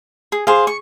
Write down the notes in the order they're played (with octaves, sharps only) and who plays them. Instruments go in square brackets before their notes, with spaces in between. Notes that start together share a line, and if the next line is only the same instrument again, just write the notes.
[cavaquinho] G#4
[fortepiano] G#4 [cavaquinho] C5 F5
[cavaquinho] C#6